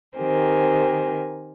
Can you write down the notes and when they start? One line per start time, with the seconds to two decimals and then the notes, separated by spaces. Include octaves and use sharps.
0.17 D#3 C4 G4 A#4 C5 G#5